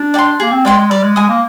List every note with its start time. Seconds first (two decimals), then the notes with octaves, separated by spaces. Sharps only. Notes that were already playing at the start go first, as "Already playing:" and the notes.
Already playing: D4
0.14 D5 G5 C6
0.40 A#3 G#4
0.52 C4
0.65 G#3 D5 G5 C6
0.78 G#3
0.91 G3 D5
1.04 G#3
1.16 G#3 G#5 D#6
1.29 A#3